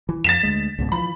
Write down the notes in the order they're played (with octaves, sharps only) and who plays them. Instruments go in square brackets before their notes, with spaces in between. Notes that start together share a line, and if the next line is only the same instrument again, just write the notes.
[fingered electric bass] E3
[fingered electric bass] F2 [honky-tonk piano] A6 B6 E7
[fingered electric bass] D2 G#3
C#2 G#2 B2
[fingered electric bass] E3 F3 [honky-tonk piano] B5